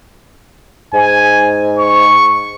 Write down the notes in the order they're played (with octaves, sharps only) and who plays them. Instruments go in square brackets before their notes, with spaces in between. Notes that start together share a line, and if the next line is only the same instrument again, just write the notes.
[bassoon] G#2 [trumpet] G#5
[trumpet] C#6